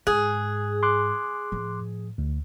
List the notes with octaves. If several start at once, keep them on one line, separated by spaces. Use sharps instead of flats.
G#2 G#4 F#6
C6 D6 F#6
A2 F3
D2